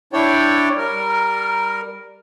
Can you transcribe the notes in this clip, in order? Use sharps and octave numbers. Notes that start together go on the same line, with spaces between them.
D4 E4 C#5 D5 G5
G3 A#4